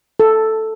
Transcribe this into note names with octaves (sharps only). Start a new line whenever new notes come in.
A4